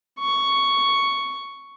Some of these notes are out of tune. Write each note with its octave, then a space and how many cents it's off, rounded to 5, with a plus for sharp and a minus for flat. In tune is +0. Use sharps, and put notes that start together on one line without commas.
C#6 +5